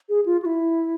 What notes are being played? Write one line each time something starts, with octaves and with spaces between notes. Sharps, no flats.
G#4
F4
F#4
E4